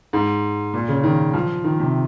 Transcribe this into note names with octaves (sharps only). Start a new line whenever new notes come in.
G#2
A#2
C#3
D#3
F3
D#3
C3